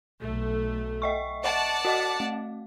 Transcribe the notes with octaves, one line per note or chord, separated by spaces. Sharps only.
B1 A3
D#5 E5 C#6
D5 F#5 A5
F#4 D#5 D6
A3